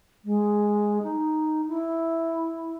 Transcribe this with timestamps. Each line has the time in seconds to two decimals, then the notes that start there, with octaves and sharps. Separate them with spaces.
0.25 G#3
1.03 D#4
1.68 E4